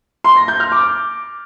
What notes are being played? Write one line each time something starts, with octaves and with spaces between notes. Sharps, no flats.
C6
A#6
G6
F6
D6